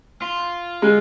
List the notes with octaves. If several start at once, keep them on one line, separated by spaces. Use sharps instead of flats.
F4
G#3